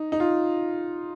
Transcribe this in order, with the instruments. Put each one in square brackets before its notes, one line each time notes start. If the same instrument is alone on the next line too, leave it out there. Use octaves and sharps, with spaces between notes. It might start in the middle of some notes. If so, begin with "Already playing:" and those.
Already playing: [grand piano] D#4
D#4
F4